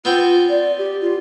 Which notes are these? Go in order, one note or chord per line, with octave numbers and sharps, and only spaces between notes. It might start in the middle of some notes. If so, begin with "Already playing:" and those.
B3 C4 F4 G5
D5
G4
F4